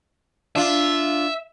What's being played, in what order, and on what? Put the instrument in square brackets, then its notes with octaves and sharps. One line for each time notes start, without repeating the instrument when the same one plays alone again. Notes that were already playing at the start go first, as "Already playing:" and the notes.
[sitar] D4 F4 [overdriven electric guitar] E5